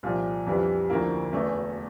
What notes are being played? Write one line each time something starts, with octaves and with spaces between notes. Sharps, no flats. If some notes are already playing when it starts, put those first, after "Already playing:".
C2 A#2 F3
F2 E3 G3 D4 F4
D2 D3 F3 A#3 E4
E1 E2 E3 A3